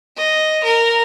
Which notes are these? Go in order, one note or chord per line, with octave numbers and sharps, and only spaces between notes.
D#5
A#4